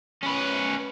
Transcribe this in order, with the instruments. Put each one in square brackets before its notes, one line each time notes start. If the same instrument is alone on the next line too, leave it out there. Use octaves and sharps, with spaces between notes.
[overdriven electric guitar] C#4 B4